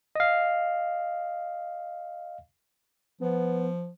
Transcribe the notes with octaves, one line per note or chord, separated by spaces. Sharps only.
D#5 F5
F3 B3